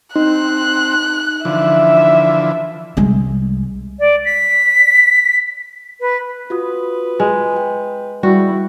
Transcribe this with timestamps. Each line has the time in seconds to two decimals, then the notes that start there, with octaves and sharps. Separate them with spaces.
0.16 C4 D#4 F#6
1.45 D3 E3 F3 E5
2.97 C2 G#3
3.99 D5
4.25 B6
6.00 B4
6.50 F4 F#4 B4 D#6
7.20 G#3
7.56 G5
8.23 G3 E4 F#4 G5